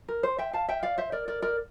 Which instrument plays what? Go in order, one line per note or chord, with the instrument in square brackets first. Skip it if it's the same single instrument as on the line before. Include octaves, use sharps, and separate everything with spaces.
[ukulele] A#4
C5
E5 G5
F5 A5
E5 G5
D5 F5
C5 E5
A#4 D5
A#4 D5
A#4 D5